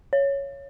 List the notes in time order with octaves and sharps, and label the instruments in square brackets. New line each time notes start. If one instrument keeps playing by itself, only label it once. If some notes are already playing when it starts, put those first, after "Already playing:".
[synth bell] C#5